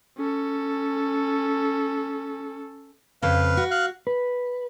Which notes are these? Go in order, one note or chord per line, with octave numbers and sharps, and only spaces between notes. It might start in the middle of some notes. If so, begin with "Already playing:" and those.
C#4 A4
F2 C#3 B4 F5
F#4
F5 F#6
B4